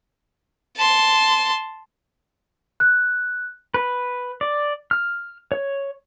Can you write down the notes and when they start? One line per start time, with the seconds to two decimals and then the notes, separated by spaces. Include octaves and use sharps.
0.77 A5 C6
2.80 F#6
3.74 B4
4.41 D5
4.91 F6
5.52 C#5